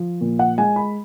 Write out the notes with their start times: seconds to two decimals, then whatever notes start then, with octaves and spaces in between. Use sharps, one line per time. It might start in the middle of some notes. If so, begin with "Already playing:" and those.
Already playing: F3
0.21 A#2
0.39 F#5
0.58 G#3 G#5
0.76 B5